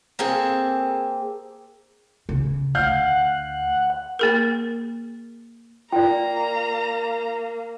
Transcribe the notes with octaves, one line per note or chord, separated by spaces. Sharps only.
A#3 C4 G#4 A4
C#3
D2 F5 F#5 F6 G6
A#3 G#4 A#4
A#3 F4 D5 G5 A#5